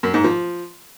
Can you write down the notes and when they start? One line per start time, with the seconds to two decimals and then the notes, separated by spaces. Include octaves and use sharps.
0.03 F#2
0.14 G#2
0.24 F3